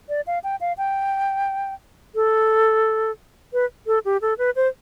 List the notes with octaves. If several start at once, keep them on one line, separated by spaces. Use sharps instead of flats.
D5
F5
G5
F5
G5
A4
B4
A4
G4
A4
B4
C5